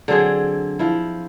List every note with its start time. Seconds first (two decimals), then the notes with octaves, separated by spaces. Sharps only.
0.08 D3 F#3 C4 G#4
0.79 F3 E4